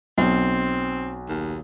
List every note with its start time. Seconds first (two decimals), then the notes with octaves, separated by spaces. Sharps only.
0.18 B1 C4
1.28 D#2